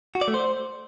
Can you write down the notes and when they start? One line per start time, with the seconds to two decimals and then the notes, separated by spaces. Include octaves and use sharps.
0.15 F#4
0.21 D5
0.28 A3
0.34 C5